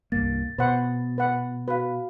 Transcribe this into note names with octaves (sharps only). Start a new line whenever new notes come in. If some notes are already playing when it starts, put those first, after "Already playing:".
C2 G2 A#3 A6
B2 B4 C5 F#5
B4 F#5
F#4 B4 F5